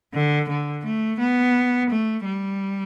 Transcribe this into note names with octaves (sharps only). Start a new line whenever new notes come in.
D3
D3
A3
B3
A3
G3